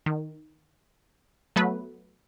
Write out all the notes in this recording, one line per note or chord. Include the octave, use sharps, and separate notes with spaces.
D#3
F#3 A3 B3 B4